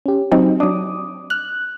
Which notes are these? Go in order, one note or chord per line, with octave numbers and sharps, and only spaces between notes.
C#4 G4
F#3 C4 D#4
F#3 D4 D6 D#6
F6 F#6